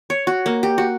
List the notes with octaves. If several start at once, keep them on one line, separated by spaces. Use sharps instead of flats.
C#5
F#4
A#3
G4
F#4